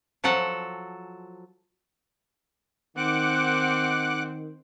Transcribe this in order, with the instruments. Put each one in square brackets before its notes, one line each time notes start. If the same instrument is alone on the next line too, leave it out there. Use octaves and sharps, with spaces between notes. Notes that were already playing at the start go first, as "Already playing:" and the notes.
[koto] F3 F#3 F#4 A4 F#5
[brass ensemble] D#3 [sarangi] C4 [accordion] F#5 D6 F#6